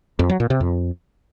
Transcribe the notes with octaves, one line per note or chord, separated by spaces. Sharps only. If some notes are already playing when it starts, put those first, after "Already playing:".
F2
F#3
A#2
C3
F2